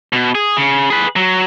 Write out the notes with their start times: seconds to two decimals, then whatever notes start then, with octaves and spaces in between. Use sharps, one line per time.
0.13 B2
0.35 G#4
0.57 C#3
0.90 G#4 B4
1.16 F#3